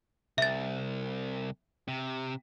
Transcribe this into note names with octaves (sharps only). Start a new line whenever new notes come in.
C2 E5 A6
C3